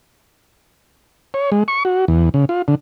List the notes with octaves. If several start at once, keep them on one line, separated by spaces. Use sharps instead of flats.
C#5
G#3
C#6
F#4
E2
C#3
F4
D3